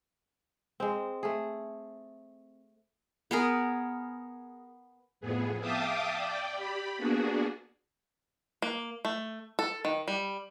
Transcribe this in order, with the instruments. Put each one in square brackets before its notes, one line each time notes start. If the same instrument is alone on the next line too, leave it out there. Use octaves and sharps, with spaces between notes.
[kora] G#3 C4
A3 G#4
[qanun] B3 G#4 A#4
[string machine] F2 A2 B3 G#4
E5 F5 G5 A5 D6 D#6
D5 G5
G4 B5
A#3 B3 D4 F#4 G#4
[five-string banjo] A#3
A3
A4
D#3
G3